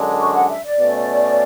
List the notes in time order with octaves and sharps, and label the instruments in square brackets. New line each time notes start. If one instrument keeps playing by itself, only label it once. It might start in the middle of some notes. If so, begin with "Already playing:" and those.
Already playing: [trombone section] F#2 D3 G#3 D4
[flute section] C#6
F#5
E5
D5
[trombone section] B2 A3 C#4